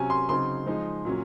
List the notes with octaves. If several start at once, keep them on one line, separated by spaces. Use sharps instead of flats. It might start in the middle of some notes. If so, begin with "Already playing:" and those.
Already playing: C3 F#3 C#4 G#5
C6
C#3 F#3 C4 D#4 C6
F3 G#3 D#4
A#2 F#3 C#4